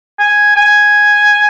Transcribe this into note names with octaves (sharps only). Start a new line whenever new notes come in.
G#5
G#5